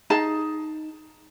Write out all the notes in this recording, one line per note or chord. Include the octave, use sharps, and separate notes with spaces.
D#4 G#4 A5